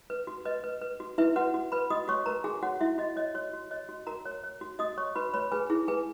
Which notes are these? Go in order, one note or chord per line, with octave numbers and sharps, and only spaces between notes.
B4
F#4
B4 D#5
B4
B4
F#4
E4 B4 E5
F#4 B4 F#5
F#4
B4 B5
F#4 D#5 D#6
F#4 C#5 C#6
A#4 B4 A#5
F#4 G#4 G#5
F#4 C#5 F#5
E4 F#4 E5
F#4 D#5
C#5 D#5
F#4 C#5
F#4
C#5 D#5
F#4
F#4 A#4 A#5
C#5
C#5
F#4
F#4 D#5 D#6
C#5 C#6
F#4 B4 B5
B4 C#5 B5
G#4 B4 G#5
E4 G#4 G#5
G#4 B4 G#5